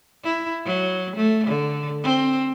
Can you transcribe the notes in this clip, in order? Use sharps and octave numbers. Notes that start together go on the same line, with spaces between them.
E4
F#3
A3
D3
C4